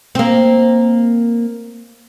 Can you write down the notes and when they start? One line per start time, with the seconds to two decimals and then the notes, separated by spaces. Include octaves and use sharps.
0.15 A#3 C4